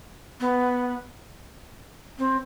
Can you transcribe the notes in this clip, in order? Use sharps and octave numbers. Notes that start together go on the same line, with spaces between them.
B3
C4